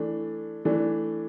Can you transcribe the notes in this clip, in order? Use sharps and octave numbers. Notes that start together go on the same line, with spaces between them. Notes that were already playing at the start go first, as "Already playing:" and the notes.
Already playing: E3 A3 D4
E3 A3 D4